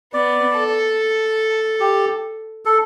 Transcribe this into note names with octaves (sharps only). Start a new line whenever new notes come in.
B3 D5
A4
G4
A4